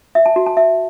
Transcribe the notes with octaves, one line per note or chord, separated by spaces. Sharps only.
E5
A5
F#4
A5
E5